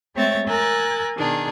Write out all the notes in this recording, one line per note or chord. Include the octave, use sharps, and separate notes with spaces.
G#3 A3 C4 C#5 E5 A6
A#4 G#5 E6 F#6 A6
B2 D#3 D4 G#4